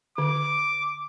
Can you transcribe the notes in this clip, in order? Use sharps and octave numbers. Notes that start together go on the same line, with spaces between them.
D3 D6